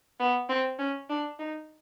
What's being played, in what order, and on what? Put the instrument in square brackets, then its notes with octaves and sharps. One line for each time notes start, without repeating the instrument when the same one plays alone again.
[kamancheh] B3
C4
C#4
D4
D#4